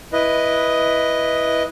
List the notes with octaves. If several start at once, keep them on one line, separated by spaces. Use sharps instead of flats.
E4 B4 D#5